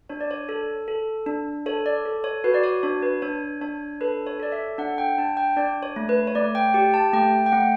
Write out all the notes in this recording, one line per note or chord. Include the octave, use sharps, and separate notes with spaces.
D4 C#5
D5
C#5
A4
A4
D4
A4 C#5
D5
A4
C#5
F#4 B4
D5
C#5
D4 C#5
B4
D4 C#5
D4 C#5
A4 B4
C#5
A4 D5
E5
D4 F#5
G5
D4 A5
G5
D4 D5
C#5
A3
B4
C#5
A3 D5
G5
G4 G5
A5
A3 G5
G5
A3 F#5